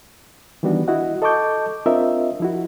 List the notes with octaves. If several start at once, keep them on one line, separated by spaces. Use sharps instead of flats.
D#3 E3 G3 B3 D4 F#4
E4 F#4 D#5 F#5
A4 D#5 A5 C#6 D6 G6
C4 D4 F4 A#4 D#5 E5
F3 E4 F#4